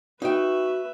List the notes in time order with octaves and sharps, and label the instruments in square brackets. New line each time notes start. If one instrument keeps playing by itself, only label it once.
[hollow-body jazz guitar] D#4 G5 [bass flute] F#4 [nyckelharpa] B4 E5